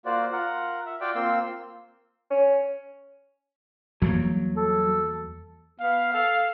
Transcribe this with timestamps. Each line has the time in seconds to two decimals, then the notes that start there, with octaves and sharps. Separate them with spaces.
0.05 A#3 F4 F#4 C5 D5
0.32 F4 A#4 F#5
0.86 E5
1.01 F4 F#4 D5 F5 G5 D6
1.15 A#3 C4 F4 C6 E6
2.31 C#4
4.02 E2 F#3 G3 A#3
4.57 A4
5.80 B3 F5
6.13 A4 F5